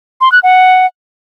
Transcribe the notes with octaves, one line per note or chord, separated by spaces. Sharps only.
C6
F#6
F#5